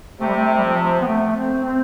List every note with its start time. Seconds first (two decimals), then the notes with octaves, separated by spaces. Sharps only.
0.20 C3 A3
0.27 G3
0.35 A3
0.57 G3
0.63 F3
1.01 B3
1.07 A3
1.36 C4
1.64 C4